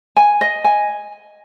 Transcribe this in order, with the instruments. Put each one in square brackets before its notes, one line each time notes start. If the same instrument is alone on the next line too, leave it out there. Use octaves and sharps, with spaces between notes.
[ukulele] G#5
D#5
G#5